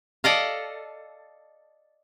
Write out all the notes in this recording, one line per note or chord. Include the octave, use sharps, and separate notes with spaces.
A4 D5 D#5 F5